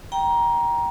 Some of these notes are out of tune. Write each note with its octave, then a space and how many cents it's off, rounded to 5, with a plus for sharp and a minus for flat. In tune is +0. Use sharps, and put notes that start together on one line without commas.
G5 +0 A#5 +15